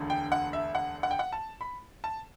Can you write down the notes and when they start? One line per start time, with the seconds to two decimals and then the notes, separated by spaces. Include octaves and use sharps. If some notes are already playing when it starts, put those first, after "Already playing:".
Already playing: E1 D2 D3
0.10 G5
0.32 F#5
0.53 E5
0.75 F#5
1.03 F#5
1.11 G5
1.19 F#5
1.33 A5
1.61 B5
2.04 A5